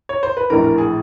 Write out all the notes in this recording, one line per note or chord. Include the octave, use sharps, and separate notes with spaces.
C#5
C5
B4
A#1 A2 E3 A#4
A#4
G#4